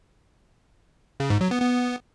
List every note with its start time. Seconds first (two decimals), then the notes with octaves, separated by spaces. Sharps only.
1.20 C#3
1.30 G#2
1.41 F#3
1.51 B3
1.62 B3